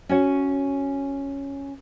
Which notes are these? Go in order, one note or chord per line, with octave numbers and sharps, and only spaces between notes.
C#4 F#4 C#5 F#5